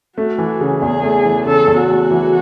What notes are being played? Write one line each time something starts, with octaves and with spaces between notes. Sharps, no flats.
A3 F#4
E3
C#3
E2 G#4
A3
E3
C#3 A4
E2
F#4
A3
E3